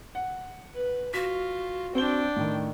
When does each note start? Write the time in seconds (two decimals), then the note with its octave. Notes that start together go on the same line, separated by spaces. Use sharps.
0.15 F#5
0.74 B4
1.14 F4 F#4 B6
1.95 C4 D4 C5 G5 G7
2.36 A2 D#3